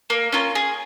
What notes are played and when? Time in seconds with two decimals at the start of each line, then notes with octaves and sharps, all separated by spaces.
0.10 A#3
0.32 C#4 F4 A#4
0.55 G#4